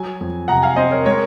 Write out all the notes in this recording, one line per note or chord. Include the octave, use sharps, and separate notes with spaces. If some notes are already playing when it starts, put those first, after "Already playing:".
Already playing: F#3 G#5
F2
C3 F#5 A#5
F5 G#5
C4 C5 D#5
A#4 C#5
G#3 A#4 C#5